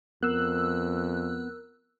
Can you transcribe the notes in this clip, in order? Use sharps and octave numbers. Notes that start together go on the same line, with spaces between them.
F2 B3 A#4 E6 F#6